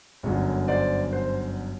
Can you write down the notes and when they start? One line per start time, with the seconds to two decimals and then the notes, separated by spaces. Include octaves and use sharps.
0.23 G1 F#2 D3 F#3 C#5
0.68 C5 D5
1.13 C5